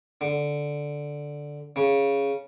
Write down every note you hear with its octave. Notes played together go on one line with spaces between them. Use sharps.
D3
C#3